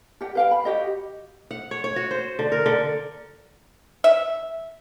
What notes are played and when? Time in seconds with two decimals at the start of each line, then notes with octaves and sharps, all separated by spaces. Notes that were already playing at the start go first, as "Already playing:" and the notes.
0.21 G4 F#5
0.35 B4 F5 G5
0.51 B5
0.64 F#4 G4 D#5 F#5
1.51 F#5
1.71 C#5
1.84 C#5
1.96 F#4
2.11 C5
2.39 D3
2.52 A#4
2.66 D3
4.04 E5